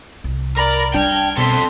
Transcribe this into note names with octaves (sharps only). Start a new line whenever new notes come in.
C2
A#4 D5 A#5 B5 A#6
G3 D4 G5 A5 F6 G#6
B2 C4 A4 C6 B6